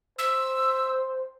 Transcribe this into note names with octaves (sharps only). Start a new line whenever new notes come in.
C5 E6